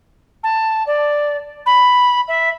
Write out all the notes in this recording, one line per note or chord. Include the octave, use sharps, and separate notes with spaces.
A5
D5
B5
E5